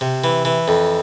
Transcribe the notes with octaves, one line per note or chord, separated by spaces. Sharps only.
C3
E3
E3
F2